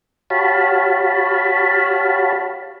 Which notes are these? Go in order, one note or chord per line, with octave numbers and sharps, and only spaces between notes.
F#4 G4 C#5 F5 A5 B5